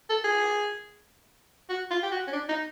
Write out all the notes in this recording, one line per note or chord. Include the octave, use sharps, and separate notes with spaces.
A4
G#4
F#4
F4
G4
F#4
C#4
D4
D#4